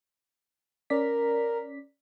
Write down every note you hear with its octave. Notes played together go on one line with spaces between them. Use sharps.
C#4 A#4 D5 B6